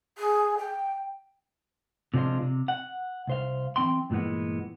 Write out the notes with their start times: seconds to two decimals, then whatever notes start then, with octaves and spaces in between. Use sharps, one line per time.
0.18 G#4
0.58 G5
2.14 C3 F3 G#3 D4 F4
2.42 C3
2.68 F#5
3.27 C2 C5 F5
3.76 E3 F#3 C4 G5 C6
4.10 G2 A#2 E3 G#3 B3